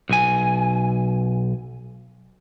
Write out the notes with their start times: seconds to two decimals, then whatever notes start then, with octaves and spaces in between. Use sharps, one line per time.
0.09 B1 G#5